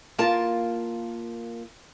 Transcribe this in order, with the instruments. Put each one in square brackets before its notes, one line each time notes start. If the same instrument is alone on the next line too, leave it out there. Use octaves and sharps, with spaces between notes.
[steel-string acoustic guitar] A#3 F4 A#4 A5